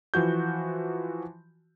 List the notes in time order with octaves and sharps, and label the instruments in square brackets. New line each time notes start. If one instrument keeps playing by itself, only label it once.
[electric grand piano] E3 F3 F#4 G6